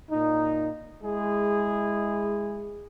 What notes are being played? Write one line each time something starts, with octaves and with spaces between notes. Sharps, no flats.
A#2 D#4
G#3 E4 G#4